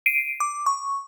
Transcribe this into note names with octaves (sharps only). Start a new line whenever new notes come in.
C7 D7 D#7
D6
C#6